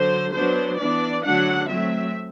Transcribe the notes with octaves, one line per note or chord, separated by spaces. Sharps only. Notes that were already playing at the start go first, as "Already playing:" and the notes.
Already playing: D3 F#3 C5
F#3 B3 D4 C5
E3 B3 D4 D5
D3 F#3 A3 D4 F#5
F#3 A3 C4 E5